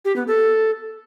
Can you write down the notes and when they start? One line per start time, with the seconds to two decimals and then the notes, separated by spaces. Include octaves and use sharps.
0.05 G4
0.16 B3
0.27 A4